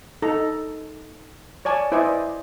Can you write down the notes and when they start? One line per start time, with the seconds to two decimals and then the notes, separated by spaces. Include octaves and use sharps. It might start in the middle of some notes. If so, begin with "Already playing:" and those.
0.22 D#4 A4 A#5
1.65 C#5 D5 G#5 A5
1.92 E4 B4 C5 D5 D#5 G#5